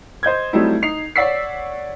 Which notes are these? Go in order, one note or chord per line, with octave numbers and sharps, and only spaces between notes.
C5 D#5 G6 G#6
F#3 G3 A3 C4 D#4 E4
D#4 C7 F7
C#5 D5 F#5 E6 B6 C7